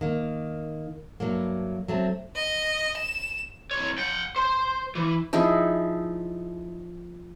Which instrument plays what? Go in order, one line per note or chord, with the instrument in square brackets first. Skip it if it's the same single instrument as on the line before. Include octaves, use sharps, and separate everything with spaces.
[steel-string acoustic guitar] D#3 A#3
G2 F#3 A3 A#3
F#3 A3 C4
[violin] D#5
E7
[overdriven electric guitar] C2 C#5
F#5 G5
C5
E3
[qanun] F3 D#4 E4 G#4